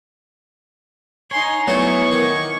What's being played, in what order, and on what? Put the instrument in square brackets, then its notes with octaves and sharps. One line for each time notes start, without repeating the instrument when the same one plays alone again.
[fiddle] D#4 C6 [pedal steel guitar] C#5 [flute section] G#5 A#5
[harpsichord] F#3 A3 [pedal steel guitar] B3 E4 [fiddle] C#6
[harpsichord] D#3 [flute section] A#4 D6 G#6